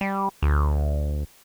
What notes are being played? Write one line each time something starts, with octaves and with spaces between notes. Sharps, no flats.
G3
D2